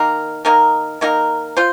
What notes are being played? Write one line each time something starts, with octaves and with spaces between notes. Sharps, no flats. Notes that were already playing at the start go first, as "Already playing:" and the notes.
Already playing: D#3 A#3 D#4 A#4
D#3 A#3 D#4 A#4
D#3 A#3 D#4 A#4
F4 C5